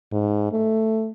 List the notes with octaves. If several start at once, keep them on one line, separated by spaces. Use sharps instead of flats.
G#2
A3